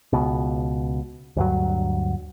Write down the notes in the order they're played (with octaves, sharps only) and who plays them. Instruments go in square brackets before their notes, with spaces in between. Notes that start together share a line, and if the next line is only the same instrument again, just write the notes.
[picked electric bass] C#2 B2
D2 G2 F#3